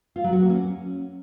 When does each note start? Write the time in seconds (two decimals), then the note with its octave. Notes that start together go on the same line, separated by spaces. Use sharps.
0.16 F4
0.24 F#3
0.33 F#4
0.41 A#3
0.50 C#4